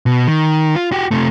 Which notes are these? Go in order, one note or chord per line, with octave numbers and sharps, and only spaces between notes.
B2
D#3
F4
F#4 G4
C3 A3